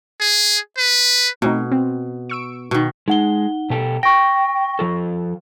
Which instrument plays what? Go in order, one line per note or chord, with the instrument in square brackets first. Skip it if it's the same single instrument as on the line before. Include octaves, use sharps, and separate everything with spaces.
[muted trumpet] G#4
B4
[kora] B2 [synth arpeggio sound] A3 C4 D#4
[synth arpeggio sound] C4
C#6 E6 D7
[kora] B2 D#3
[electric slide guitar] G#3 [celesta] D#4 F#5 G7
[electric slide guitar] B2 G4 A4
[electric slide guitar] G5 [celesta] C#6 A#6
[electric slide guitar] F3 F4 A4